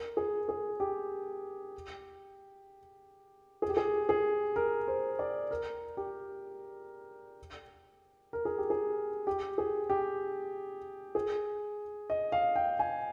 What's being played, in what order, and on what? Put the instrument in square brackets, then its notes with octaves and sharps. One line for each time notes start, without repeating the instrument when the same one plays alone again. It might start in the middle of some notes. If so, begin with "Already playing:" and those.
Already playing: [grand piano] A#4
G#4
G#4
G4
G#4
G4
G#4
G#4
A#4
C5
D5
A#4
G4
A#4
G#4
G4
G#4
G4
G#4
G4
G#4
D#5
F5
G5
G#5